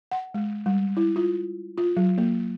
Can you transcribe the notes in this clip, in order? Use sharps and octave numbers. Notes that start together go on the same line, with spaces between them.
F#5
G#3
G3
E4
F4
F4
F#3
A#3